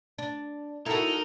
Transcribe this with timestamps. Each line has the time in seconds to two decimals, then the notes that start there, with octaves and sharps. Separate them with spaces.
0.18 D4
0.86 D#4 E4 F#4 A4 A#4